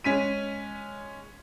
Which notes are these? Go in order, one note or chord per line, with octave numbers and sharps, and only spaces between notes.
G#3 C#4 B6 D#7